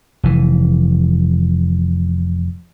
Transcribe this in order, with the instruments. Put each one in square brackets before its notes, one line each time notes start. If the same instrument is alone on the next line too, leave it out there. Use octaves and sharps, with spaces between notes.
[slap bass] F1 E3